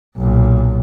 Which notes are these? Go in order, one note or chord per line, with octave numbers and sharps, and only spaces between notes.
B1 A#2